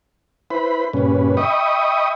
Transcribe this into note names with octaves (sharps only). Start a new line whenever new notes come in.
E4 B4 C5 B5
G2 A#2 C#3 C#4 B4
D#5 E5 G5 B5 C#6 D#6